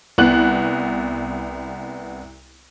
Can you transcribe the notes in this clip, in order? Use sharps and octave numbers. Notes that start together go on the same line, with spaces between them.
C2 B3 F#6 F#7